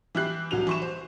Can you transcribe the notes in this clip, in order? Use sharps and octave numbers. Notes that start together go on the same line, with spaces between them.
E3 E4 G4 F#6 C7
C2 F#3 F7
E3 C#6 E7
C5